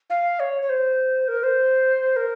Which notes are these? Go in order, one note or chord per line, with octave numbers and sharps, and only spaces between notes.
F5
C#5
C#5
C5
A#4
C5
A#4